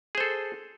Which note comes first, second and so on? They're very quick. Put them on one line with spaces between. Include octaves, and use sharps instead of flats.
G#4 C5 A4